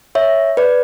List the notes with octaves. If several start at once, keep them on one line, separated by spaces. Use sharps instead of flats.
C#5 E5
B4 D5